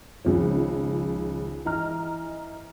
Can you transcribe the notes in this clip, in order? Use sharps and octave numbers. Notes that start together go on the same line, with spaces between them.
C#2 D#3 F3
E3 D#5 A#5 F6